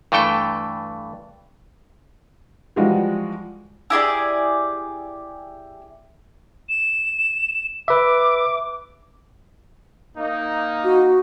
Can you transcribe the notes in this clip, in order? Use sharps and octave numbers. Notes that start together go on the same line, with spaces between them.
G2 E3 A3 A4 G5
E3 F3 G3 G#3 F4 F#4
E4 G4 G#4 D5
E7
B4 E5 D6
A#3 D#4
F#4